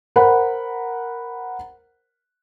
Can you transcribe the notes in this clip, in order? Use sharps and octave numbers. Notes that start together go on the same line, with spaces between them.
A#4 C5 F#5 B5